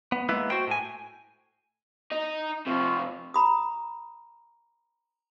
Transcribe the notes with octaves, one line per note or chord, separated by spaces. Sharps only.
B3
G#3 A#3 B3 E4 B4
F#4 C5 G5
A2 G#5
D#4
F2 C3 F4 C#6
A#5 B5 D#6